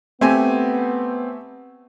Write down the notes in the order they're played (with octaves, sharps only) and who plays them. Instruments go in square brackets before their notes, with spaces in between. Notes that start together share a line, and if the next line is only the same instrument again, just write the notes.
[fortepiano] A3 G4 G#5 [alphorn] B3 [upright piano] C4